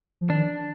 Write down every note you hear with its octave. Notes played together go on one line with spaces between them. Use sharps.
F3
D#3 D4